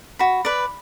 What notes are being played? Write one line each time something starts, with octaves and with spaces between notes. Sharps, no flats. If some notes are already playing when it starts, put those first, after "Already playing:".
F#4 B5
B4 D5